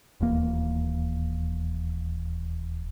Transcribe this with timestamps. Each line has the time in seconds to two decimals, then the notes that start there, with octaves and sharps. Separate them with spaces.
0.20 D#1 E2 A#3